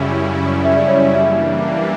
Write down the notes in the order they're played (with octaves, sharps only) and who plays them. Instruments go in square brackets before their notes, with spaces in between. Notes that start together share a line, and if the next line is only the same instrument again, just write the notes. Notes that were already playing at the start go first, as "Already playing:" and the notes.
Already playing: [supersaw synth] F#2 C#3 G3 C#4 E4
[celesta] E5
D5
C#5
D5
[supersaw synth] E3 G3 A#3 D4 [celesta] E5